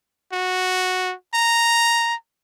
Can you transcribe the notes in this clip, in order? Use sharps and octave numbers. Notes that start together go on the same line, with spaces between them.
F#4
A#5